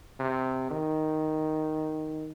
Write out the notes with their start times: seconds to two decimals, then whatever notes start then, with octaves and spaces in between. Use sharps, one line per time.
0.19 C3
0.71 D#3